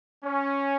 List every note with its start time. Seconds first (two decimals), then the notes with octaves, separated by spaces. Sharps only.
0.24 C#4